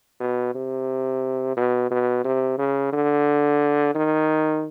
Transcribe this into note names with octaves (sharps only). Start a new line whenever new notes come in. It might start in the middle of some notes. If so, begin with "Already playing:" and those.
B2
C3
B2
B2
C3
C#3
D3
D#3